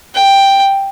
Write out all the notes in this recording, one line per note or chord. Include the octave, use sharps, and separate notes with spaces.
G5